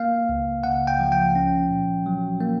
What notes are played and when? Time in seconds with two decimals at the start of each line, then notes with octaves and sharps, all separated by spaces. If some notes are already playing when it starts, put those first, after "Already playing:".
Already playing: A#3 F5
0.29 C#2
0.64 C#3 F#5
0.87 G5
1.00 F3
1.12 G5
1.35 C#4
1.70 A#2
2.06 F#3
2.41 A#3